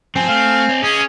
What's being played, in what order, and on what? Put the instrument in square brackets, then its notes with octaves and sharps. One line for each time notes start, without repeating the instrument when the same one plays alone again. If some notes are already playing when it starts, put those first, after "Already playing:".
[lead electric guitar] G2 F3 [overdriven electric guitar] C4 [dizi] G#5
[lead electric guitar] A3 [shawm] F5
[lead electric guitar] C#5 D#5
[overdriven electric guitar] C#4 [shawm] G#4